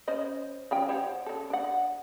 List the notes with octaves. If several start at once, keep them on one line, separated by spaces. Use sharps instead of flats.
C#4 C5 D#5
F3 C#4 G5
C5 C#5 F#5
C#3 A4
D4 F#5